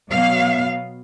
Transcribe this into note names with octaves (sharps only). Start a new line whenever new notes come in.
B2 F#3 B3 F5